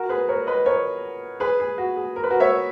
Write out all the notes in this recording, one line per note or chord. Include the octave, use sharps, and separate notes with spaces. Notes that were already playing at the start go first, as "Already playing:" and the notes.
Already playing: F#4 A#4
G#4 B4
A#4 C#5
B4 D#5
A#4 C#5
G#4 B4
G#4
F#4
G#4
A#4
B4
F#4 A#4
C#5 E5